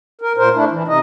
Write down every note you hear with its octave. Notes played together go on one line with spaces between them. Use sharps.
A#4
A#2 A#4 C5
A3 D4 E4
E3
C3 D#4 D#5